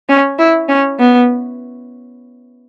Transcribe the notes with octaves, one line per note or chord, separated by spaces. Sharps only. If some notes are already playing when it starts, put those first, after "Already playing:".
C#4
E4
C#4
B3